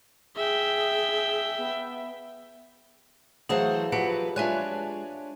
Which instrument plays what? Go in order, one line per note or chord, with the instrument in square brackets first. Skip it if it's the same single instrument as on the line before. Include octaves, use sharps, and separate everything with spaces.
[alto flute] G#4 [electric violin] E5 G5
[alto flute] B3
[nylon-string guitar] E3 F#3 [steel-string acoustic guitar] A3 C5 F#5 [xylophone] G#4 F5
[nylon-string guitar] F3 F#3 C4 [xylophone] G4 F#5 D7 [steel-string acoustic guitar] B4
[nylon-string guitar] G#3 F4 [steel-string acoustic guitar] D4 C#5 [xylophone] E5 G#5 F#6